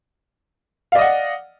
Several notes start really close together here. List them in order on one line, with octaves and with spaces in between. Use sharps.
F5 D5 D#5 F#5